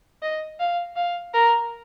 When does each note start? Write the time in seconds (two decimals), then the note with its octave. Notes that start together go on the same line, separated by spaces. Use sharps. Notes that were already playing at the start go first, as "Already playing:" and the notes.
0.22 D#5
0.60 F5
0.96 F5
1.34 A#4